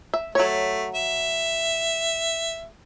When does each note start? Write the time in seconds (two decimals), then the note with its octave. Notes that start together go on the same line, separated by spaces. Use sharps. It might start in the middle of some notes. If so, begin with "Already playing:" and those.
0.14 E5
0.35 F#3 A3 C#5
0.95 E5